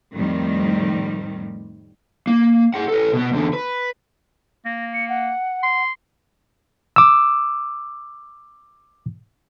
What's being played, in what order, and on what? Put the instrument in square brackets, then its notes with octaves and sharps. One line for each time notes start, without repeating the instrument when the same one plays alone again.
[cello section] F2 A2 D#3 G3 C4
[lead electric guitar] A#3
G#4 F#5
A4 B4
B2 B3
E2 D3
B4
[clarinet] A#3 [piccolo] A#6
[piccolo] C#7
F#5
[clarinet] C6
[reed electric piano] D6 E6